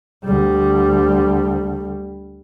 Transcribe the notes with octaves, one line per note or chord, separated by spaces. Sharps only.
D2 G3